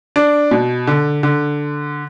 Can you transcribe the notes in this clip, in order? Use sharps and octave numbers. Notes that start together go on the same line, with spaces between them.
D4
B2
D3
D3